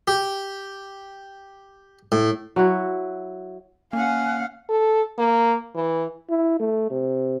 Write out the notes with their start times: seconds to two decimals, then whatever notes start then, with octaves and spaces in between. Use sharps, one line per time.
0.08 G4
2.12 A2
2.56 F#3 E4 F#4
3.93 A#3 C#4 F5 F#5 G#5
4.69 A4
5.18 A#3
5.75 E3
6.30 E4
6.60 A3
6.91 C3